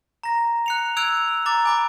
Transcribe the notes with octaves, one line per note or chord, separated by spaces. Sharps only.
A#5 A#6
F#6 C#7 F7
E6 F#6 G#6 D7 F7
A#5 D6 A6
G#5 B5 D6